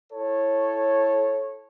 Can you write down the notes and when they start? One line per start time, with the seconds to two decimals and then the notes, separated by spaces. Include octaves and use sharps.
0.12 E4 A4 C#5